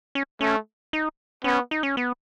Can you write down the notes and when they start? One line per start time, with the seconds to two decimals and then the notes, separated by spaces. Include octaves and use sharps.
0.15 C#4
0.41 A3 C#4
0.93 D#4
1.44 B3 C#4
1.71 D#4
1.83 C#4
1.97 B3